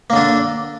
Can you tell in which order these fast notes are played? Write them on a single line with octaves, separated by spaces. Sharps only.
A#3 D3 D4